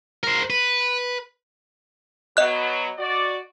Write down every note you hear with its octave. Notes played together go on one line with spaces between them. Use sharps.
A#4 C5
B4
F#3 B3 D#5 F#6
F#4 D5